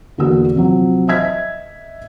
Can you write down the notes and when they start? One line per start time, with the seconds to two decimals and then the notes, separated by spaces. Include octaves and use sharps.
0.18 E2 D3 A#3 F#4 E6
0.56 C3 F3 F#3
1.08 D#5 E5 E6 G#6 B6